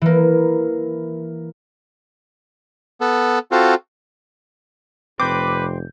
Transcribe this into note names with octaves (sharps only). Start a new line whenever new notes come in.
E3 A#3
B3 A4
C4 F4 F#4 A4
F1 C4 B4 D6 G6